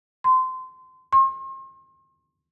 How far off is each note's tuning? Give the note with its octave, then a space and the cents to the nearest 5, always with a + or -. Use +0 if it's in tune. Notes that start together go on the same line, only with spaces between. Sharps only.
C6 -20
C6 +40